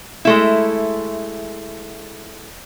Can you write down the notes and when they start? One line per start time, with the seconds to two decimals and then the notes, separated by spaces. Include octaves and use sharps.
0.25 G#3 A3 E4